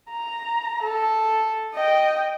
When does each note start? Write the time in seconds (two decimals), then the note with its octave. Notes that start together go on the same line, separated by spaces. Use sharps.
0.11 A#5
0.83 A4
1.75 D#5 G5